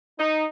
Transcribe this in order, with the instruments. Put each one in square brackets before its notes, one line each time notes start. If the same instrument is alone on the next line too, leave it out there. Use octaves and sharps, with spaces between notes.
[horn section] D#4